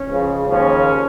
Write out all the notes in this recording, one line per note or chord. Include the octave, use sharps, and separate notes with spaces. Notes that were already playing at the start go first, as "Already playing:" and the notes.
Already playing: C#4
C#2 C#3 F3
D#2 C#3 F3 A#3 C#4